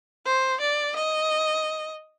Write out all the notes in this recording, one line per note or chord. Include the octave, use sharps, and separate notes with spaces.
C5
D5
D#5